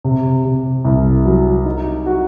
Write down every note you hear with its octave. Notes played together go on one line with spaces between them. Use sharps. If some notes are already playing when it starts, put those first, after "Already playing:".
C3
C3
C2
F#3
D#4
F#4